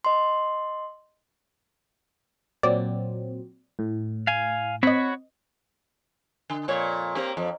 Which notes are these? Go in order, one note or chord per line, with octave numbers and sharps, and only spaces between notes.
D#5 C6
A#2 F#3 C4 D5
A2
F5 G#5
C4 F#4 C#5 D#5 B5
D3
F2 A#2 C#5
A#3 C4 G4
F2